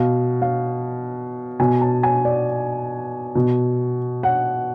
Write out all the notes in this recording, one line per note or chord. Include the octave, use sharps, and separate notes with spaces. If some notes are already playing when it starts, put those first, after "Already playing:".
Already playing: B2 F5
F5
B2 G#5
A5
G#5
D5
B2
F#5